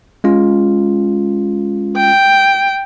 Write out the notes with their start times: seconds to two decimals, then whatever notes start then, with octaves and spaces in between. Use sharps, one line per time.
0.24 G#3 C#4 F4
1.97 G5